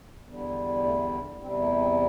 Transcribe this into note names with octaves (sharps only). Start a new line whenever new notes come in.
E2 D3 G3
A3
E2 C3 G3 C4
A3
C4